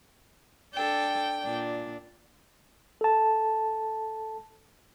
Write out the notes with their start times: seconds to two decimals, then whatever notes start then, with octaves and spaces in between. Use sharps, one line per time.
0.74 D4 A4 G5
1.42 A#2 D4
3.01 A4 A5